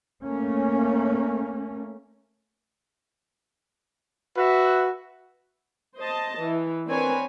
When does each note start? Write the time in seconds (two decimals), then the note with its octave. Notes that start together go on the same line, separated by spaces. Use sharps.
0.24 A3 A#3 C#4
4.36 F#4 B4 E5
5.98 C5 D#5 A5
6.40 E3
6.87 C4 D4 A#4 B4 C#5 G#5